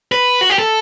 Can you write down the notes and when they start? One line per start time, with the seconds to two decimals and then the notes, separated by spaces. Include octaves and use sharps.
0.12 B4
0.41 F#4
0.50 G4
0.59 A4